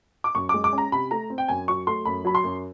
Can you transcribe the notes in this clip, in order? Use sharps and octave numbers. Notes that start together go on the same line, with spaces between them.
D6
F#2 C#6
G#3 D6
D6
C#4
A#5
C3 B5
A3 A#5
C4
G5
F#2 G#5
F#3 C#6
A3 C6
F#2 B5
F#3 B5
C6
F#2